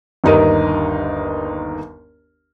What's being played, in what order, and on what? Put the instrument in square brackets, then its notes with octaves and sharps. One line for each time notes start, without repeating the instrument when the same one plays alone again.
[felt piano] G1 D#2 D#4 A#4 D#7